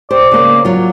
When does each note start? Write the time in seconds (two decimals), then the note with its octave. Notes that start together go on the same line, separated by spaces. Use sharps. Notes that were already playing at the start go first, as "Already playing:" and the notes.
0.11 G4 C5 D5
0.31 C#3 A#3
0.65 F#3 F4